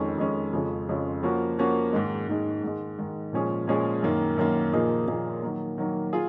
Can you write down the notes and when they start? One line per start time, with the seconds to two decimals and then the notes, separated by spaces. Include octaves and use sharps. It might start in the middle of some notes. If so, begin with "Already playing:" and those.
Already playing: F2 D#3 G#3 C#4
0.18 F2 D#3 G#3 C#4
0.53 F2 C#3 G#3 C#4 F4
0.89 F2 C#3 G#3 C#4 F4
1.23 F3 A#3 C#4 F#4
1.59 F3 A#3 C#4 F#4
1.93 G#2 D#3 G#3
2.28 G#2 D#3 G#3
2.63 G#2 D#3 G#3
2.99 G#2 D#3 G#3
3.33 A#2 F3 G#3 C#4 G#4
3.67 A#2 F3 G#3 C#4 G#4
4.02 F#2 D#3 A#3
4.38 F#2 D#3 A#3
4.73 A#2 F3 A#3 D#4 G#4
5.08 A#2 F3 A#3 D#4 G#4
5.43 D#3 F#3 A#3
5.78 D#3 F#3 A#3
6.13 F4 G#4